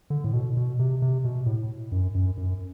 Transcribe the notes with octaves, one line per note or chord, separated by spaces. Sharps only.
D3
A2
B2
B2
C3
C3
B2
A2
F#2
F#2
F#2